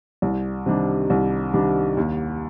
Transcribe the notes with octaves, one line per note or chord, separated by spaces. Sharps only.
C2
C3 D#3 G3 D4
C2
C3 D#3 G3 D4
D#2